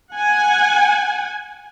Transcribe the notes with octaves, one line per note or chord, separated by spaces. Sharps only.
F#5 G#5